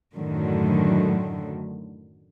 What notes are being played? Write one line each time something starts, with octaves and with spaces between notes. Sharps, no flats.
F#2 A2 D3 D#3 F#3